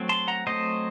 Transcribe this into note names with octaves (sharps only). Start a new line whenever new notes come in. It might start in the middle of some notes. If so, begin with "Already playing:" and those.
Already playing: F#3 A3 C4
A5 C6
F#5 A#5
F#3 A3 C4 C5 D#5